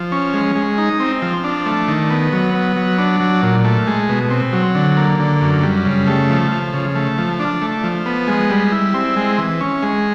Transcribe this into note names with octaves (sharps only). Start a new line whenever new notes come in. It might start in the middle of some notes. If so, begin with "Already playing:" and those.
Already playing: F3
C#4
G#3
G#3
D#4
C4
F3
D4
A3
D#3
B3
F#3
B3
F#3
D4
F#3
A#2
A3
G#3
B2
C4
F#3
D3
A#3
D3
F#2
G3
C#3
A3
F3
F3
C#3
A3
F3
D4
A3
F3
B3
G#3
G3
E4
C4
G#3
E3
C#4
G#3